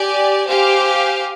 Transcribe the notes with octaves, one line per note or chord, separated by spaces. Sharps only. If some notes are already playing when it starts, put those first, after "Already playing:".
Already playing: G4 D5 G#5
G4 C5 F5 G#5